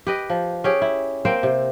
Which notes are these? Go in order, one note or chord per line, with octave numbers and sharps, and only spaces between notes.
G4 B4 D#5
F3
C#4 G4 G#4
E4
A#3 C4 C5 G5
C3